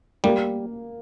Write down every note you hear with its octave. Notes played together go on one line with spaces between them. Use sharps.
G3 A#3